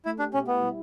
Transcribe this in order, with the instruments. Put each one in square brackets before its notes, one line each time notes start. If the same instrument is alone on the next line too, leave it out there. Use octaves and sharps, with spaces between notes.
[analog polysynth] A3 [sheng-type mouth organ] E4
[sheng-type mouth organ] D4 [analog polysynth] G4
[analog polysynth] B2 [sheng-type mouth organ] C#4
[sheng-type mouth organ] B3 [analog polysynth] E4
[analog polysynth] G3